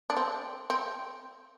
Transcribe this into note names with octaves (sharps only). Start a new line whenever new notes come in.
D4
C4
C4